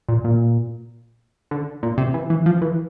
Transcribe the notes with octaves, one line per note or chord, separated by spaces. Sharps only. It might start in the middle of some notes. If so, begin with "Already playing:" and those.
A#2
A#2
D3
A#2
C3
E3
E3
F3
E3